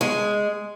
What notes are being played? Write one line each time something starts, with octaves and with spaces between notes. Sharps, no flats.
G#3